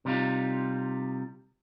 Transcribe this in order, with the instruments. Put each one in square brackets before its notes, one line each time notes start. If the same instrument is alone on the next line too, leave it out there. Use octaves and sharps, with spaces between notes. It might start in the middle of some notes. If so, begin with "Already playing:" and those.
[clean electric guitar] C3 G3 D#4 F4